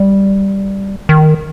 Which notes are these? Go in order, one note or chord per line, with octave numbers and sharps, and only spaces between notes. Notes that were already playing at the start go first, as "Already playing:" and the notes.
Already playing: G3
D#3